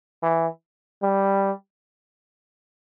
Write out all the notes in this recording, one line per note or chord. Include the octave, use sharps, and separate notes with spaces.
E3
G3